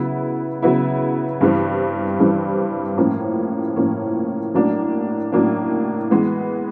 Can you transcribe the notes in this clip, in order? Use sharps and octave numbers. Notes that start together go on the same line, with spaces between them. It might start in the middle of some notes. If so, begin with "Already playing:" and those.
Already playing: C#3 F#3 B3 E4
C#3 F#3 B3 E4
G2 E3 G3 C4
G2 E3 G3 C4
A2 F3 A#3 C#4
A2 F3 A#3 C#4
A2 F#3 A#3 D4
A2 F#3 A#3 D4
E3 G#3 B3